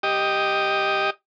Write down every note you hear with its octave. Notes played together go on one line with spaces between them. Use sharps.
G4 D#5